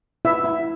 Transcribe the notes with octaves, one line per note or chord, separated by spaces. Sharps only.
E4 E5
E4